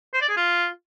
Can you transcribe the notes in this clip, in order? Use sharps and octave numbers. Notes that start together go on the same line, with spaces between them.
C5
D5
G#4
F4